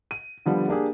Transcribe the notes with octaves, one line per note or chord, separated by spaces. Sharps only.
D#7
D3 F3 G3 B3
A#3 D4 G4 G#4